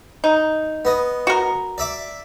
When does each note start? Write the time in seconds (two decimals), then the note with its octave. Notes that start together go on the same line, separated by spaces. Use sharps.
0.24 D#4
0.85 B3 D#5
1.27 F#4 A#4
1.78 D5 E5 D6